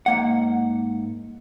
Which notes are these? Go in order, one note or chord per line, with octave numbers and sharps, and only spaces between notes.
G#2 A#3 F#5